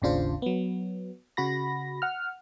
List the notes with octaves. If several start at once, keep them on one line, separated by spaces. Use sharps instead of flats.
G#1 D#2 C#3 D4 F4 C5
F#3 B3
C#3 F#4 B5 A#6
F#5 F6